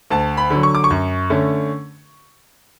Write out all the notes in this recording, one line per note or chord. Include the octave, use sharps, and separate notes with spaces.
D2 A5
B5
D3 F#3
C#6
D6
C#6
F#2
D3 A3 C#4